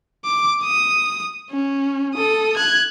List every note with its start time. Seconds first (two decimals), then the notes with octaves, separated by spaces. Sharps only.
0.25 D6
0.63 D#6
1.51 C#4
2.15 A4 D#6
2.57 F#6 G#6